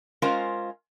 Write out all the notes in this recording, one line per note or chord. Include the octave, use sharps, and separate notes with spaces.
G#3 C#4 F4 A#4 C5 F5